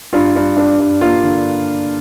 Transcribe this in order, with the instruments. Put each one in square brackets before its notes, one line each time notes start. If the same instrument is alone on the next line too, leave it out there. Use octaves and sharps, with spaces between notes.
[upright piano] G2 [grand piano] F4
[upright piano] G2
[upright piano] G2 [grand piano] D4
[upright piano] G2
[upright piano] A#3 [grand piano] F4
[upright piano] D3